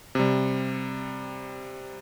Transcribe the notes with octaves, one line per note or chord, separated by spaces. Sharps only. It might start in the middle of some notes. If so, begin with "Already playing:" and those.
C3 G3